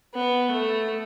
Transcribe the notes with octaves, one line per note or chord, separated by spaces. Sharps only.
B3
A3